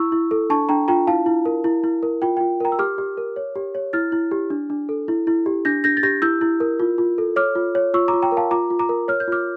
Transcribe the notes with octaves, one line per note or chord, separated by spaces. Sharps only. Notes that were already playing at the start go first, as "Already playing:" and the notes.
Already playing: E4 C#6 E6
E4
A4
D4 A5 C#6
D4 G5 A#5
F4 G5 A#5
E4 F5 A5
E4
A#4
E4
E4
A#4
F4 G5
F4 G5
A#4 G5 A#5
E6
G4 D6 F6
G4
A#4
C#5
G4
C#5
E4 F6 A6
E4
G4
D4
D4
A4
E4
E4
G4
D4 G6 A#6
D4 G6 A#6
A6
G4 G6 A#6
E4 E6 G6
E4
A#4
F4
F4
A4
C#5 D6 F6
F4
C#5
F4 C#6 E6
A#5 D6
F4
G5 A#5
A#4
F5 A5
F4 A#5 D6
F4
A#5 D6
A#4
C#5 F6
G6
F4 D6 F6